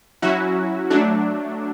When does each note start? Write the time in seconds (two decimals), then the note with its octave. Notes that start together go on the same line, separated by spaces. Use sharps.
0.22 F#3 C#4 E4 F#4
0.90 F#3 A3 D4